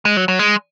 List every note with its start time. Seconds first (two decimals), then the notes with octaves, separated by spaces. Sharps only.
0.05 G#3
0.17 F#3
0.28 F#3
0.39 G#3